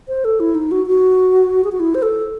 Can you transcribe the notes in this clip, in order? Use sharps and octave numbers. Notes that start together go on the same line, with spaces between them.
C5
A4
E4
D#4
F#4
F#4
G#4
F#4
E4
C5
A4